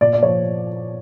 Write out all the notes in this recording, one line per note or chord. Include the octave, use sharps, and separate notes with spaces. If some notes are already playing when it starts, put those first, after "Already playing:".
A#2 D5
D5
F3 C#5